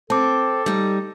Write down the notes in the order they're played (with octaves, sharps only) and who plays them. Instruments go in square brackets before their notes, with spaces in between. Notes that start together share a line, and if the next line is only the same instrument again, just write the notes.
[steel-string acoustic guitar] C4 [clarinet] A4 [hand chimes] A5 D6
[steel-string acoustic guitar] G3 D#4